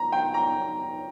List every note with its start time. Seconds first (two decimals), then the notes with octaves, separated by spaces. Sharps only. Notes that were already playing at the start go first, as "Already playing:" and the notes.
Already playing: A#5
0.12 G5
0.34 A#5